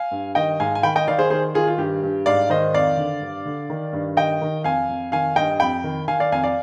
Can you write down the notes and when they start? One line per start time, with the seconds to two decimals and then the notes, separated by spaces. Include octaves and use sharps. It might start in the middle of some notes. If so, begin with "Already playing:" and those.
Already playing: F5 G#5
0.11 G2
0.35 D#3 D#5 G5
0.60 G#2 F5 G#5
0.75 G#5
0.83 D#3 G5 B5
0.96 D#5 G5
1.08 D#3 D5 F5
1.19 G#4 C5
1.30 D#3 G#4 C5
1.55 D#3 F4 G#4
1.67 F4
1.78 G2 G4
2.03 G2
2.26 G#2 D5 F5
2.50 D#3 C5 D#5
2.74 F2 D5 F5
2.97 D3
3.21 G2
3.46 D3
3.70 D#3
3.93 G2
4.17 D#3 D#5 G5
4.42 D#3
4.64 F2 F5 G#5
4.89 F2
5.12 D#3 F5 G#5
5.36 G2 D#5 G5
5.60 F2 G5 B5
5.84 D#3
6.08 D#3 F5 G#5
6.20 D5 F5
6.32 F2 F5 G#5
6.44 D5 F5